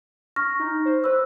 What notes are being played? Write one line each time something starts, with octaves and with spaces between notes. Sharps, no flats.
C#6 F6 A#6
D#4
C5
B4 C5 E6